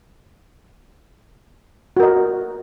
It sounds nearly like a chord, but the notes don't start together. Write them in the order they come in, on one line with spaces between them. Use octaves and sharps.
F#4 A#4 D#5